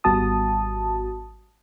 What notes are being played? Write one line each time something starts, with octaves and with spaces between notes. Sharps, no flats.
G#1 G3 B3 F#4 A5 D#6